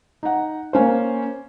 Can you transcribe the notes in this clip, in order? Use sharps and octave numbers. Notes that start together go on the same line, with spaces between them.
D#4 F#5
A#3 C#4 C5